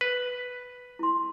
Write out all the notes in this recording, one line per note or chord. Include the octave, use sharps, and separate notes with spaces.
B4
E4 C6